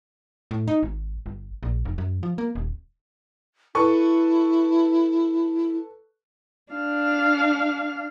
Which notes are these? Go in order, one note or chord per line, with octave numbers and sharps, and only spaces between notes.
A2
D#4
G#1
G1
A#1
F1
F#2
F3
A#3
D#1
E4 A4 B4 C#6
D4 F5